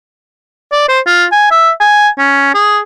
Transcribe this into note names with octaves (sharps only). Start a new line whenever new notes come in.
D5
C5
F4
G#5
E5
G#5
C#4
G#4